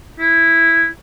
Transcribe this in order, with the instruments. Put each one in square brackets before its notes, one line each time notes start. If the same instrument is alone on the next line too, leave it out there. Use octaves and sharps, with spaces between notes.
[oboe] E4